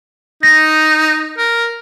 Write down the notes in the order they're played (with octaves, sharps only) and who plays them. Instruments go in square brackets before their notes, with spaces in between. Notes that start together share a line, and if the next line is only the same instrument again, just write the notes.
[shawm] D#4 [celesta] A#6
[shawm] A#4